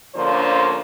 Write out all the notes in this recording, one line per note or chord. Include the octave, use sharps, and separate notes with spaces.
D2 D3 F3 A#3 C#4 C5